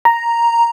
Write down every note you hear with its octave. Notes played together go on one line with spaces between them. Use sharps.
A#5